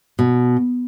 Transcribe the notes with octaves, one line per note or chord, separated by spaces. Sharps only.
B2